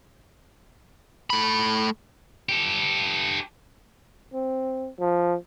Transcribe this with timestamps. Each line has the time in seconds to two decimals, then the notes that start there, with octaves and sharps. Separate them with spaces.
1.30 A3 B5
2.49 G4 A4
4.34 C4
4.99 F3